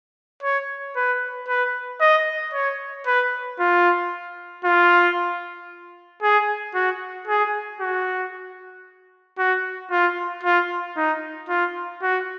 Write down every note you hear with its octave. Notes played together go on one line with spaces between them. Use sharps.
C#5
B4
B4
D#5
C#5
B4
F4
F4
G#4
F#4
G#4
F#4
F#4
F4
F4
D#4
F4
F#4